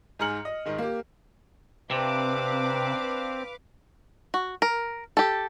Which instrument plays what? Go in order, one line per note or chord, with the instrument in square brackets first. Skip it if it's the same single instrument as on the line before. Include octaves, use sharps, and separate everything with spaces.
[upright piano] G#2 G#4 A#5 F6 C#7 F#7
D#5
G#2 D#3 D#4
A#3 G4
[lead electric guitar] C3 [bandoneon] C4 [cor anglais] D4 [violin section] B4 F5 D6
[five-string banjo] F#4
A#4
G4 A4